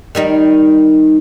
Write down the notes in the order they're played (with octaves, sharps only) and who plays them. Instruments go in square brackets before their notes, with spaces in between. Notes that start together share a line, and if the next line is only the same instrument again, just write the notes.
[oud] D#3 G3 D#4